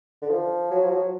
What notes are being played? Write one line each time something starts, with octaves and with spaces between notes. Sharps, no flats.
D3
F3
F#3
F3
F#3